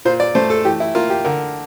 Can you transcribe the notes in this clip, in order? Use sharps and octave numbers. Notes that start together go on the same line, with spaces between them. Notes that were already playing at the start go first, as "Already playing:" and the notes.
A#2 C5
D5
A3 C5
A4
E3 G4
E4
A#3 F4
G4
D3 A#4